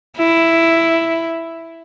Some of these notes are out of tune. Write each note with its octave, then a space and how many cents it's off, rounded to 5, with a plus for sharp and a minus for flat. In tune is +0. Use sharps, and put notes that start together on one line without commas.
E4 +5